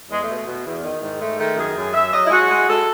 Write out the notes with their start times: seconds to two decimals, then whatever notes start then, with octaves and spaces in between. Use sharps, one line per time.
0.09 E2 G#3
0.21 A3
0.28 B2
0.34 A3
0.46 B2
0.65 E2
0.83 D#3
1.02 G#2
1.20 G#3 A3
1.38 D#3 A3
1.57 F#2 G#4
1.76 F#2
1.94 F#2 E5
2.12 F#3 D#5
2.25 E4
2.30 G#3 F#4
2.49 G#3
2.68 G#3 A4